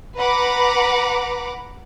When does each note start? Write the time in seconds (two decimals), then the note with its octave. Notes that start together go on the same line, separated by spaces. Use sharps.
0.17 B4 F#5 A#5 B5 D6